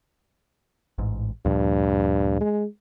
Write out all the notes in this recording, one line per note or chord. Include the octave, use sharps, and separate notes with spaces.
A1 G#2
D2 G2 A#2 F3
G#3